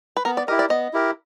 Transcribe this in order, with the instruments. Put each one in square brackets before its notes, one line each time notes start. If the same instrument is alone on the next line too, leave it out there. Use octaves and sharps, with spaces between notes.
[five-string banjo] B4
[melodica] B3 [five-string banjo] A#4
[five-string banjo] D5
[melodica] E4 G4 A#4 [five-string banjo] D#5
[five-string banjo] D5
[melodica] B3 [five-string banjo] D#5
[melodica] E4 G4 A#4